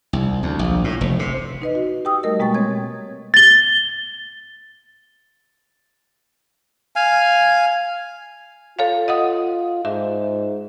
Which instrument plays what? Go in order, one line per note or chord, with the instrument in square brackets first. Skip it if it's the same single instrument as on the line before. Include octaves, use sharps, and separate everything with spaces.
[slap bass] C2
D2
A#1
A2
F1
C3
[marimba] D#4 B4 D#5
F#4
G4 G5 D#6 E6
G3 A3 A#4 D#5
B2 G#3 A#3 G5 C#6 A6
C4 C#5 G#6
[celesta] A6 G7
[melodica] F5 G#5
[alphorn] F4 [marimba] A4 C#5 F5
[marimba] D#5 F#5 D#6
[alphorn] G#2 [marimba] E5